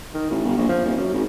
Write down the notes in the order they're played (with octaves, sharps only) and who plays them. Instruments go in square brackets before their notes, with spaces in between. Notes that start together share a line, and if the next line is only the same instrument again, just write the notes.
[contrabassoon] D#3
A1
G1
A#1
F3
D#1
F#2
G#1